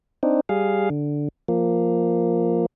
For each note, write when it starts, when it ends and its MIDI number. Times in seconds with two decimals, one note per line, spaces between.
0.23 0.41 60
0.23 0.41 62
0.23 0.41 63
0.49 0.89 55
0.49 0.89 68
0.49 0.89 77
0.90 1.28 50
1.48 2.66 53
1.48 2.66 58